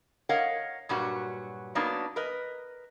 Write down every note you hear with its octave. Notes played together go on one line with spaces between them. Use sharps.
A#4 C#5 D#5 F5 F#5
G2 A#2 F#3 G3 F#4
F#3 A#3 B3 D4 D#4
A#4 B4 D#5